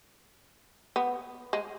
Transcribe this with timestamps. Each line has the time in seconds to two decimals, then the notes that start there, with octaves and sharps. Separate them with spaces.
0.96 B3
1.53 G#3